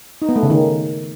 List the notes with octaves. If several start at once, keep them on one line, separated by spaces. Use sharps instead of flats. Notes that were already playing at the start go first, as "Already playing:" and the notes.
D#4
B3
A3
C#3
D#3